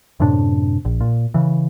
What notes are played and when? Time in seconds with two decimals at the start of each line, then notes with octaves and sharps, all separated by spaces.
0.20 F#2 A2 C3 D4
0.85 A#1
1.01 A#2
1.34 C#3 E3